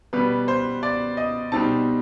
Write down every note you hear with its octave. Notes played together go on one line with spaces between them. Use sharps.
B2 G3 B3 B4
C5
D5
D#5
B2 G3 C4 D#4 A5